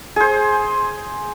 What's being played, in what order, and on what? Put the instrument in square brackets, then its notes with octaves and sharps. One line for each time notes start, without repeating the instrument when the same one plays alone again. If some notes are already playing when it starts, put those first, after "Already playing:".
[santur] G#4 C5